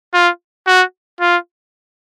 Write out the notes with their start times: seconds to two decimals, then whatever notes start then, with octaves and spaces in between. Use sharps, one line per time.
0.14 F4
0.67 F#4
1.20 F4